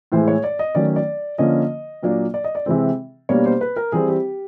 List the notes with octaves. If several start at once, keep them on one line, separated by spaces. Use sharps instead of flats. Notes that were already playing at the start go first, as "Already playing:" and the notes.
A2 E3 G#3 C5
C#5
D5
D#5
D#3 F#3 A3 C#4 D5
D5
D3 F3 A#3 C#4 D#5
A#2 F#3 A#3 D4
D5
D#5
D5
C3 E3 G#3 C4
B2 G3 A#3 D4 C#5
C5
B4
A#4
E3 G3 C4 G#4
G4